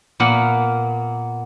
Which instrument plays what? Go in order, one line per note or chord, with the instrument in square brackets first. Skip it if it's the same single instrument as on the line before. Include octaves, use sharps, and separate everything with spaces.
[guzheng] A#2 A#3 B3 F#5